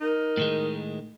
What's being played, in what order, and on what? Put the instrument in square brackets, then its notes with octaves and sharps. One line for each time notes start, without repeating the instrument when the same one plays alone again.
[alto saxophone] D#4 [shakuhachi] A#4
[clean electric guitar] A2 D#3 G#3